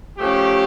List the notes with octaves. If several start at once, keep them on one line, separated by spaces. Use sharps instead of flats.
F3 A3 C#4 G4